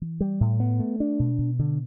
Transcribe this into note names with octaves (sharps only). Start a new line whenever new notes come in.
E3
G3
A2
B3
A3
D4
B2
B2
D3